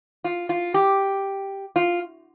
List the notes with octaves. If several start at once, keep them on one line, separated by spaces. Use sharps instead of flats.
F4
F4
G4
F4